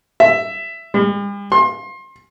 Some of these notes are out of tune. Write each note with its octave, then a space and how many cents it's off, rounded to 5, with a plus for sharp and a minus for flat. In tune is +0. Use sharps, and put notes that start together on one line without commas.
E5 +10
G3 +45
C6 +30